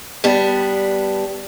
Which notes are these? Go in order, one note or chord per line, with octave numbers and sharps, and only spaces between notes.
G3 B3 D4